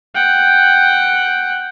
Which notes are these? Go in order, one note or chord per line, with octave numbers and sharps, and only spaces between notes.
F#5 G5